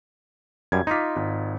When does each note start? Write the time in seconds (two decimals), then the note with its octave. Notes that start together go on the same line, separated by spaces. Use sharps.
0.72 F#2 G3 G#6
0.87 D#4 F4 C6 D6 B6
1.16 G#1